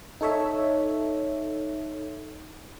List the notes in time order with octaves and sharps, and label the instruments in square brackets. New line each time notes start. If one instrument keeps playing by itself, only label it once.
[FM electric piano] D#4 A4 C#5 E5